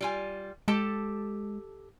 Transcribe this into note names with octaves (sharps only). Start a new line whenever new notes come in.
G3 F4 G#5
G#3 G4 A4 A5